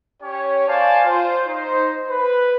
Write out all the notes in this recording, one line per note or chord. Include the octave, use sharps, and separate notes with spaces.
C#4 G4 C#5
C5 D5 F5 G#5 A5
F4 C5
D#4 C5
B4